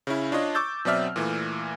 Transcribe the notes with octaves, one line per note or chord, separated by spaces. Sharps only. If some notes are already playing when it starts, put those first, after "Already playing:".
C#3 C#4 E4
D4 F4 C#5 D#5
C#6 D6 E6 G6 A6
B2 F#3 C4 D5 E5 F6
A#2 E3 A3